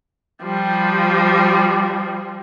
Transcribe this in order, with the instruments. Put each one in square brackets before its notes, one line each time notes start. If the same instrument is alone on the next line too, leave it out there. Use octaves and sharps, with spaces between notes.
[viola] F3 G3